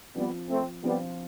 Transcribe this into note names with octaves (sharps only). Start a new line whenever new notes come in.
F3 G3 B3 C4 F4
A3 C4
F3 G3 B3 C4 F4